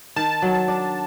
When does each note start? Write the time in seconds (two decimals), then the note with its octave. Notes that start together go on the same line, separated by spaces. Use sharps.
0.16 D#3 A5
0.42 F#3
0.68 D4